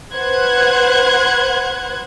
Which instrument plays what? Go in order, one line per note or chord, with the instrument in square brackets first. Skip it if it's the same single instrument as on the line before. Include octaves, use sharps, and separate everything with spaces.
[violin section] B4 C5 F#5 F#6 G#6